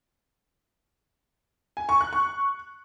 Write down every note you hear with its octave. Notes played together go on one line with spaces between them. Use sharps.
G#5
C#6
F#6
C#6